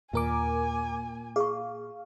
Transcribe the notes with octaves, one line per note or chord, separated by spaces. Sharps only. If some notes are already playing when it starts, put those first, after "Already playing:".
D#2 A#2 A#4 G#5 D6
G#4 F5 C#6